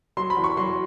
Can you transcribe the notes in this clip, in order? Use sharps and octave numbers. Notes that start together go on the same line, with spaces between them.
F#3 C6
B5
E2
C#6
F#3 C6